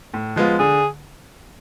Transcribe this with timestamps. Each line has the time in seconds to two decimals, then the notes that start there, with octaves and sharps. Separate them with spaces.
0.14 A2
0.36 F3 G#3 B3 F4
0.59 D3 G#4